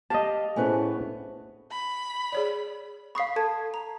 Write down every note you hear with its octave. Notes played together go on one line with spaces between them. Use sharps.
G4 A4 D#5 F5 A5
A2 A3 B3 C#4 G#4 C5 G#5
B5
G#4 C#5 D5
F5 B5 C#6 D#6 C7
A4 A5 G#6
A#5